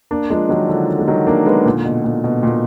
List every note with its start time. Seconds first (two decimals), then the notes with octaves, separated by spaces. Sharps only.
0.11 A#3 D4
0.30 F3 G#3
0.49 D#3 F#3
0.69 D3 F3
0.99 G#3
1.08 D#3 F#3
1.27 A#3 D4
1.46 G#3 B3
1.66 A#2 D3
1.85 B2
2.04 A#2
2.24 B2
2.43 A#2